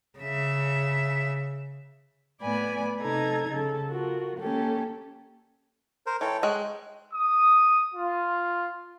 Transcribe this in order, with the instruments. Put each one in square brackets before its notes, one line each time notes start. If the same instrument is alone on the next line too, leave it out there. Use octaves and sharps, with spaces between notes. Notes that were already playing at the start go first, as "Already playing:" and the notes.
[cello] C#3 E5
[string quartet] A2 B3 D5 G#5 B5
C3 D#4 A4 A#5 G#6
C#3 A4
F4 F#4 A#4
D#3 A#3 C#4 G4 A4
[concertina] A#4 C5
[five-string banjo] E3 [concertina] A4 C#5 G5
[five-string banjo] G#3 C#5 G5 [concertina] F#6
[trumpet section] D#6
F4